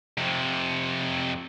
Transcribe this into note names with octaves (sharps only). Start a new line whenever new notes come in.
F2 C3